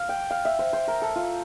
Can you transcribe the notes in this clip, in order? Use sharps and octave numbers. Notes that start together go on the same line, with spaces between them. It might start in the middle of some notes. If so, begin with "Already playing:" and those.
Already playing: F5
G5
F5
E5
C5
C5
A#4
A4
F4